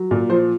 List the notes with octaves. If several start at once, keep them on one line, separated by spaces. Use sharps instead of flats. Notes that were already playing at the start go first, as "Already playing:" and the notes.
Already playing: F#3
A#2
F3 C5